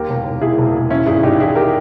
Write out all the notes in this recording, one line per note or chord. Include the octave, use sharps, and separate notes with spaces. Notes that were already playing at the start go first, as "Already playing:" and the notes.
Already playing: D#2 G4 A#4
E1
E1
E1 E4 G#4
E1
E1
E3 C#4 E4
G#1 E4 G#4
G#1 D#4 G4
E3 E4 G#4
G4 A#4